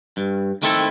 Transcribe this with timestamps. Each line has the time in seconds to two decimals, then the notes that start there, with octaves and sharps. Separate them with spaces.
0.17 G2
0.62 D#3 A3 C4 E4 A4